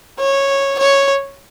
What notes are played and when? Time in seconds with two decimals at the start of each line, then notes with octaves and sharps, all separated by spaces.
0.19 C#5
0.79 C#5